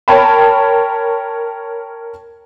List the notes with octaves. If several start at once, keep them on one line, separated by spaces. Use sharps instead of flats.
A#4 C#5 G5 A5 B5